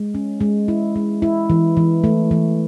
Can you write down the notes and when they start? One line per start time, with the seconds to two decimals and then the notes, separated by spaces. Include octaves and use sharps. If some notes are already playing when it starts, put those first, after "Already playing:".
Already playing: G#3
0.15 C#4
0.41 G#3
0.68 E4
0.96 G#3
1.22 E4
1.50 E3
1.77 E3
2.04 A3
2.31 E3